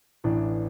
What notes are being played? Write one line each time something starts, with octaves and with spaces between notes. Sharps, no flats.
A1 A2 E3 D4